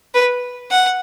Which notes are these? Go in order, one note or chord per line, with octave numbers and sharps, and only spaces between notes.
B4
F#5